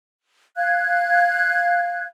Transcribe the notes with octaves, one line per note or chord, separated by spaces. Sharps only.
F5 F#6 G#6